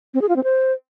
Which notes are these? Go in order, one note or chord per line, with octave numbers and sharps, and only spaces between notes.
C4
G#4
F4
C4
C5